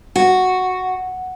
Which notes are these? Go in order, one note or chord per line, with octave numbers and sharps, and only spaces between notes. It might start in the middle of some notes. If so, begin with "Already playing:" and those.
F#4